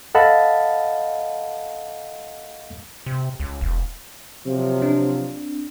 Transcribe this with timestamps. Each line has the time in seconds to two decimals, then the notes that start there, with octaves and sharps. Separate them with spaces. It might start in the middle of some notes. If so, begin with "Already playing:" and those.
0.15 A4 D#5 F5 F#5 A5 B5
3.06 C3
3.40 C#2
3.61 E1
4.46 C3 F3 F#3
4.82 C4 D4